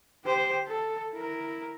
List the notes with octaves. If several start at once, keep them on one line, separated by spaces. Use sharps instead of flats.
G4 C5
A4
E4 A#4